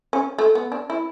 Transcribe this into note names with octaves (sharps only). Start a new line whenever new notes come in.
C#4
A3
B3
D4
E4